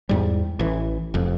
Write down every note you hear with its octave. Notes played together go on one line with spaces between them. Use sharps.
E2 G#2 G3
A1 E3
F1 F2